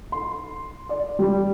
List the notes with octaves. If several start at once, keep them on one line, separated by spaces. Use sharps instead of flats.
C6
D5
G3